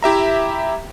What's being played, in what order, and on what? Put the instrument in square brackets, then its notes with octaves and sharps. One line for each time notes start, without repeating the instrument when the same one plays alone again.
[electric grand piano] E4 G4 E5 A#5